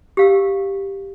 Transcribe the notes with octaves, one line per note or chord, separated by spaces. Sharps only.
G4 F5 E6